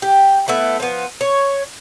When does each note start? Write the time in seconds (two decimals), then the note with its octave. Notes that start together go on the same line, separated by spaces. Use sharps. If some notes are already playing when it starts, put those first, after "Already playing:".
0.02 G4
0.48 A3 B3 E4
0.80 F3 B3
1.21 C#5